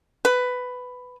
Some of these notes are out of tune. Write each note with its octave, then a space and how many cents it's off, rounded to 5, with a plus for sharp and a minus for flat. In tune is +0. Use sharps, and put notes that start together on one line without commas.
B4 +10